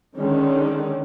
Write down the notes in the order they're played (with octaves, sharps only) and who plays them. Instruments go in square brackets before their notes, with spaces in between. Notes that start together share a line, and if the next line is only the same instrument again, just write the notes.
[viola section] D3 D#3 G#3 C#4